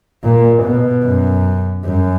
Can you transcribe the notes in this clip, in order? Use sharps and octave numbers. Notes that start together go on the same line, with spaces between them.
A#2
B2
F#2
F#2